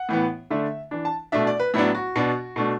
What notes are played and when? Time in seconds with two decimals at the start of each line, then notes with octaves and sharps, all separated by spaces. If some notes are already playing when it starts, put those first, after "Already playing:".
Already playing: F#5
0.09 A2 E3 B3
0.51 D3 A3 D4 E5
0.91 E3 D4
1.05 A5
1.32 B2 A3 D4 E5
1.47 D5
1.60 B4
1.74 A2 F#3 B3 D4 E4
1.95 F#4
2.16 B2 B3 D4
2.56 B2 A3 D4